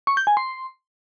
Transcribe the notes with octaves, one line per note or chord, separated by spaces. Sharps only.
C#6
G6
G#5
C6